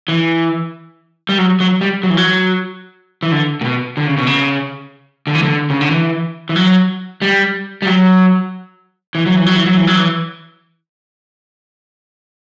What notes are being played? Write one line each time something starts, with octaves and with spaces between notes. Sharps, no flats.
E3
G3
F#3
F#3
G3
F#3
E3
F#3
E3
D3
A#2
B2
D3
C#3
B2
C#3
D3
E3
D3
C#3
D3
E3
E3
F#3
G3
G3
F#3
E3
F#3
E3
F#3
E3
F#3
E3
F#3
E3